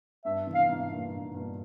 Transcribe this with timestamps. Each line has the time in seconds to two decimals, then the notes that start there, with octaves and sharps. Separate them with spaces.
0.25 G2 E5
0.47 C3 E3
0.54 F5
0.69 G#2 C3
0.90 G2 A#2
1.12 G#2
1.34 G2 A#2